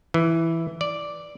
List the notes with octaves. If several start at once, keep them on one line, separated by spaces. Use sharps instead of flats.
E3
D5